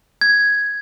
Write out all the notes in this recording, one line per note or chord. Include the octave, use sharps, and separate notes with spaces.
G#6